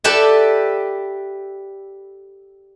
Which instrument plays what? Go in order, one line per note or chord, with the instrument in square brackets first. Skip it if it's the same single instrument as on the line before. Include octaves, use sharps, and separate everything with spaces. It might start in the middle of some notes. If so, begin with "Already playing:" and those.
[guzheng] G4 A4 B4 D5 E5